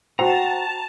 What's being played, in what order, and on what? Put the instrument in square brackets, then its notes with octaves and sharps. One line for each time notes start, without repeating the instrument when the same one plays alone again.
[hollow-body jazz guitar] F#4 C5 [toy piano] G5 [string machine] A5 [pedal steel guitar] A#5